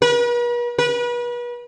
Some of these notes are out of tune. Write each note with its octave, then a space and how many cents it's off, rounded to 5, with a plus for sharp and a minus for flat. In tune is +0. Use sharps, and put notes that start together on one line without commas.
B4 -45
B4 -35